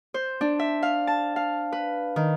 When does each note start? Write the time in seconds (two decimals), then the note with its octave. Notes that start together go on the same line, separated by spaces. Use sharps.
0.14 C5
0.41 D4
0.59 E5
0.83 F5
1.07 A5
1.36 F5
1.73 B4
2.16 D#3